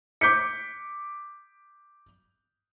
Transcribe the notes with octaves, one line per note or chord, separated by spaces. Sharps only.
D6 G6 B6 C#7